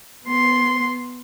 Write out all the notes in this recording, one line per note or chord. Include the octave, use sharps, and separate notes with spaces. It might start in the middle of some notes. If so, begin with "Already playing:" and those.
B3 C6